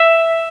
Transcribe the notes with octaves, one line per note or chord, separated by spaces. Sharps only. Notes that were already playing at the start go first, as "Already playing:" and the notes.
Already playing: E5